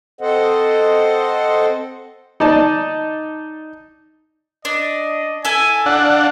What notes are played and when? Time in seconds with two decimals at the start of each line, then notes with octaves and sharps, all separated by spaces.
0.21 C4 A4 C5 D#5 F#5
2.40 D#4 D5 A5
4.65 D4 D#5
5.45 E4 A4 G#5
5.86 D4 F5 F#5